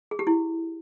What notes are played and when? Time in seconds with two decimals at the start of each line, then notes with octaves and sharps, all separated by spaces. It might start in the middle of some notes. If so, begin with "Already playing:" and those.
0.11 G#4
0.19 G4
0.27 E4